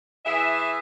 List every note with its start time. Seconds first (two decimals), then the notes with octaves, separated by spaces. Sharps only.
0.24 E3 G#4 E5